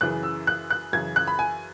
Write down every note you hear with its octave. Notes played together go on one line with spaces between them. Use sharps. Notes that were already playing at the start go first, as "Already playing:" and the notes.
F#2 C#3 E3 F#6
E6
F#6
F#6
F#2 C#3 E3 G#6
F#6
B5
G#5